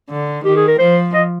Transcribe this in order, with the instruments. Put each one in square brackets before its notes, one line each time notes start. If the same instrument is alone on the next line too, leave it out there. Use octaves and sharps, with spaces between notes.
[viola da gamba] D3
[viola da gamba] D#3 [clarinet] G4
[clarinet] G#4
A#4
[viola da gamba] F3 [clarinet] C5
[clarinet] D#5